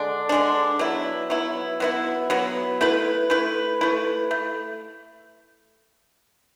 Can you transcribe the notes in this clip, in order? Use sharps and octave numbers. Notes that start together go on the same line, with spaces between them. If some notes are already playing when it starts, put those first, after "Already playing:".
Already playing: D3 G#3 D4
D3 G#3 D4
F#3 B3 E4
F#3 B3 E4
F#3 B3 E4
F#3 B3 E4
A3 E4 B4
A3 E4 B4
A3 E4 B4
A3